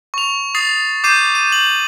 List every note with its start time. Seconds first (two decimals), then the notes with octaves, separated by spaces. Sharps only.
0.14 C#6 F7
0.55 D#6 A6 C7
1.04 D6 G6 C7 D#7
1.35 D#7
1.52 F#7